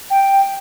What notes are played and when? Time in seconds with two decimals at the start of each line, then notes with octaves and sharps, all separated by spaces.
0.10 G5